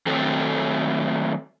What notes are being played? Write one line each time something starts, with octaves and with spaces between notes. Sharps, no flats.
D#3 F#3 A3 C4 A4